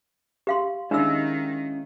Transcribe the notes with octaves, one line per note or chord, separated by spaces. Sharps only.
G4 F5 C6
D#3 G#3 C#4 D4 E4 F5 E6